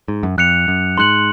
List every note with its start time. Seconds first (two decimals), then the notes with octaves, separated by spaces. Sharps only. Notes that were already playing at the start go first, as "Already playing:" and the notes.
0.08 G#2
0.23 F#2
0.38 F2 F#6 C#7 F7
0.68 F#2
0.98 G#2 C6 F#6 C#7 F#7